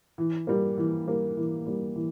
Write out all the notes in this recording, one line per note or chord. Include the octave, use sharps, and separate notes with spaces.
E3
G3 A#3
E3
G3 A#3
E3
G3 A#3
E3